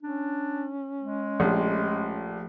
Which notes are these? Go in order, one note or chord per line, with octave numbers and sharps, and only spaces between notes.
C#4 D4
G#3
A#1 F3 A3 G4